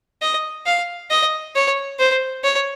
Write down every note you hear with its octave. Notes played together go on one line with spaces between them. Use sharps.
D#5
F5
D#5
C#5
C5
C#5